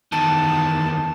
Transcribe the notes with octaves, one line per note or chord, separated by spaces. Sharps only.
E2 D#3 A5